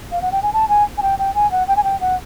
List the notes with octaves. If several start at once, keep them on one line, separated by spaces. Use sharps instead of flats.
F5
F#5
G5
G#5
A5
G#5
G#5
G5
G5
G#5
F#5
G5
G#5
G5
F#5